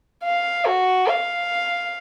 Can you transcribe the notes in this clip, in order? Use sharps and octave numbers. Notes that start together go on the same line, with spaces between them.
F5
F#4
F5